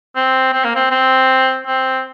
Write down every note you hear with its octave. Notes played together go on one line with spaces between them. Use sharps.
C4
C4
A#3
C4
C4
C4